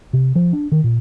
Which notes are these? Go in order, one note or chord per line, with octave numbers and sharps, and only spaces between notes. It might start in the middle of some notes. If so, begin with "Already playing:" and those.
C3
F3
D4
D#3
A#2